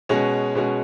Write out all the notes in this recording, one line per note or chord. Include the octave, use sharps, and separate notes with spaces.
B2 G#3 C#4 F#4
B2 G#3 C#4 F#4